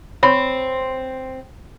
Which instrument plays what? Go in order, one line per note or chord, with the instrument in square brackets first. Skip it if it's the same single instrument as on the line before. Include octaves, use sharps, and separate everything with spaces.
[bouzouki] C4 [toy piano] C#5 B5 C#6